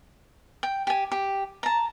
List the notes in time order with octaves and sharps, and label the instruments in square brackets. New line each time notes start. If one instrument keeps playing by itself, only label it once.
[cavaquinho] G5
G4 G#5
G4
A5 A#5